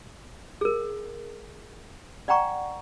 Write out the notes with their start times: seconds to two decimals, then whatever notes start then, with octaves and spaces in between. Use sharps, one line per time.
0.61 G#4 A#4
2.28 D5 F#5 G5 A#5 C#6